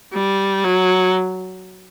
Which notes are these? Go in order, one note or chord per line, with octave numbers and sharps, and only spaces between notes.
G3
F#3